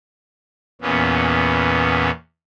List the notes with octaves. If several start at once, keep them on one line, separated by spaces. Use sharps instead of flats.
E2 A#2 B3 C#4